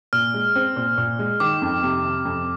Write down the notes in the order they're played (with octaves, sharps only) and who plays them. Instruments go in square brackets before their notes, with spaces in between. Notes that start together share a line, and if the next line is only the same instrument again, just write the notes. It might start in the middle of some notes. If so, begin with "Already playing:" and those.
[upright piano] A#2 [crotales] F6
[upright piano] G#3
C4
A#2
A#2
G#3
[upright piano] D#3 [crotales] D6
[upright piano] F2
C3
C3
F2